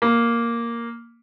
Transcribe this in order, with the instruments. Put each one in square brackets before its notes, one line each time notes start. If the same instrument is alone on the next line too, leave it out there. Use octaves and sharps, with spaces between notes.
[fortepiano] A#3